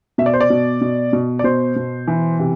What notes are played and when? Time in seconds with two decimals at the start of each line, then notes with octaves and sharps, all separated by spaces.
0.18 B2 E5
0.26 D5
0.33 C5
0.40 D5
0.50 B2
0.81 B2
1.13 B2
1.39 D5
1.44 B2 C5
1.76 B2
2.07 E3
2.39 C3